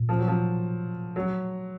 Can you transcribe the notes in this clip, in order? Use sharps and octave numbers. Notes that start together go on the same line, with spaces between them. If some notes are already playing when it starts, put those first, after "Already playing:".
Already playing: A#2
F3
F#3
F3
F#3